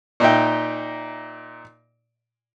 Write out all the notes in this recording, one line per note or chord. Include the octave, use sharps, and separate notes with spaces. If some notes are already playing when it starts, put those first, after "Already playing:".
A#2 D#4 E5 G5